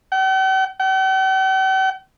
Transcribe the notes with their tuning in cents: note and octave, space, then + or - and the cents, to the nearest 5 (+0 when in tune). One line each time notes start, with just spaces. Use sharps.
G5 -45
G5 -45